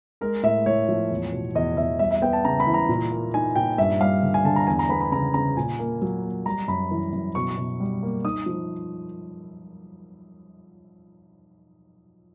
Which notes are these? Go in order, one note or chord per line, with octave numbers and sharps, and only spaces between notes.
G#3 A#4
A2 E5
A2 C#5
F3
E2
B2
E2 D#5
E2 E5
G3 E5
E5
B3 G5
A5
C#3 A#5
B5
E3
A#5
A#2
A#3
D#4 G#5
A#2 G5
G2 E5
G3 F5
D3
G#5
D3 A5
A#5
E2 G#5
A#5
B3 B5
B5
C#3 A#5
C#3 A#5
A#2 G#5
A#3
F#3
A#3
G3 A#5
F#2 B5
E3
F#2
B2 C#6
B2
G3
A#3
D#4 D#6
F3